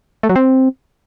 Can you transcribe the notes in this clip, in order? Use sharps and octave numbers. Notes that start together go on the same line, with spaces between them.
A3
F#3
C4